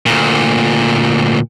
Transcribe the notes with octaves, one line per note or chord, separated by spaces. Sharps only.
D2 A#2